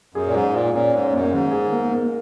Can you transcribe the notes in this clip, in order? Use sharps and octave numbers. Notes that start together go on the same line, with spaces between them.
F#2 G#4
A#2
G#2 G#4
A#2 F4
A#2 C#4
G#2 C#4
F#2 A#3
G#2 D#3
G#4
A#3
A#3